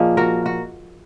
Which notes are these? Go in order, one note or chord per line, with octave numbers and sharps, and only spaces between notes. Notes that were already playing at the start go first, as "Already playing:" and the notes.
Already playing: A#2 F3 A#3 G#4 D#5
F#4 A#4
F#4